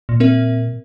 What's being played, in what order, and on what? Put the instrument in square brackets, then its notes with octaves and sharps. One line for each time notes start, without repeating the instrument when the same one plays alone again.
[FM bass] A#2
[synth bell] C4 A#4 E5